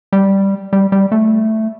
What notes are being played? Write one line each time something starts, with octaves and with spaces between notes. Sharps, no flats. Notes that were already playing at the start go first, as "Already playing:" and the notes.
G3
G3
G3
A3